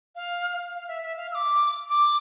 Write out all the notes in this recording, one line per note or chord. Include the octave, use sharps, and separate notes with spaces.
F5
F5
E5
E5
F5
E6
D6
D6